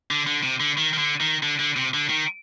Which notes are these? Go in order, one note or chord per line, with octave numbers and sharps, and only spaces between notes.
D3
D3
C3
D3
D#3
D#3
D3
D#3
D3
D3
C3
D3
D#3